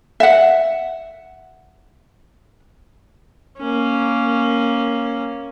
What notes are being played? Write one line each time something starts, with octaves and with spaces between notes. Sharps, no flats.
E5 F#5
A#3 C#4